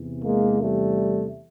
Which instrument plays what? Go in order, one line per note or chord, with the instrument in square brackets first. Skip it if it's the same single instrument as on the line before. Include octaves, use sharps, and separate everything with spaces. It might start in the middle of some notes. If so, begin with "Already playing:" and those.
Already playing: [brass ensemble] E2 C3 E3
G#3 A#3
G3 A3